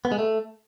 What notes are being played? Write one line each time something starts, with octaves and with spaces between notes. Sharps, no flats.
B3
G#3
A3